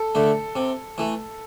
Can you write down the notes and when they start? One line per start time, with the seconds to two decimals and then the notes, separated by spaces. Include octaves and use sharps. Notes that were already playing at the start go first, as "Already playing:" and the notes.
Already playing: A4
0.15 D3 A3
0.56 C3
0.98 E3 A3